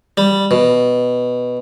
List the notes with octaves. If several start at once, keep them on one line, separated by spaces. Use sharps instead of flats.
G3
B2